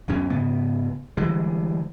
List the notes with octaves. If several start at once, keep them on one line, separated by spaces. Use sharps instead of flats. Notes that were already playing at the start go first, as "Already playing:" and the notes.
D1 F#2 B2 C#4
G#2 C#3 B3
D3 E3 G3 G#3